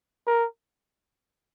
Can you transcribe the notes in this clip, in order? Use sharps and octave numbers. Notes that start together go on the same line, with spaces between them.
A#4